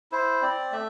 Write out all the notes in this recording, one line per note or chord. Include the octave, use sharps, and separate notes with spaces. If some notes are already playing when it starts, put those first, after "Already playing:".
E4 C5
C4 D5
A3 E5